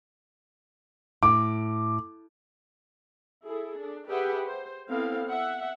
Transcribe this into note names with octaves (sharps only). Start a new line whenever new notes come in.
A2 D6
E4 G#4 A4
D4
G4 G#4 B4 E5 F#5 G5
C5
B3 C4 E4 A4 F5
E5 F#5